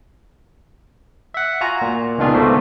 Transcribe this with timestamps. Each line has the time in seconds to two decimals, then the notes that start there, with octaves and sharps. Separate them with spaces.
1.34 E5 F#5
1.61 F4 F#4 G#5 A#5
1.82 A#2
2.18 C#2 B2 D#3 D4 F4 G#4
2.33 G#2 B2 D3 A3 A#3 C4